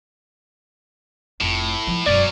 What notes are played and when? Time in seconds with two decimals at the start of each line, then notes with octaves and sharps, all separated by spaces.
1.41 F1 A2 F4
1.87 F3 E4
2.06 E1 F#2 F#3 C#4 D5